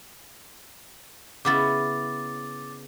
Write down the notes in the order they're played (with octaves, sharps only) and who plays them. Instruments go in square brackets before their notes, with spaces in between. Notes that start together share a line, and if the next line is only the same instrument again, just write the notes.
[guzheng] C#3 B3 E4 [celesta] D6 A6